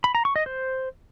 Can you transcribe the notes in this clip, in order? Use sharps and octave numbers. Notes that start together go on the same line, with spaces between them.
B5
A#5
C#6
D#5
C5